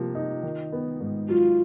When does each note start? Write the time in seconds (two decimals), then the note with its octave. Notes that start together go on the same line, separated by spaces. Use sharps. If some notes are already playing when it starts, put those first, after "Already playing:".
Already playing: C3 F3 A#3
0.15 D#4
0.43 D#3
0.72 B3
1.00 G#2
1.29 F#3 F4